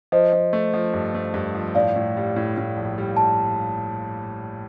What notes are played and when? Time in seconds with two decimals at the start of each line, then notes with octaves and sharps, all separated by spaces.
0.12 F3 C5 D#5
0.33 F3
0.53 A3
0.74 F3
0.94 G2
1.14 A3
1.34 G2
1.55 F3
1.75 A2 D5 F5
1.95 A2
2.17 G3
2.36 A2
2.57 A2
2.77 A#1
2.98 G3
3.17 A5